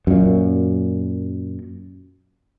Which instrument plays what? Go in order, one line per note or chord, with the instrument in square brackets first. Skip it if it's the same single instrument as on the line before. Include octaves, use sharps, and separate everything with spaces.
[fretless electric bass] F#2 A#2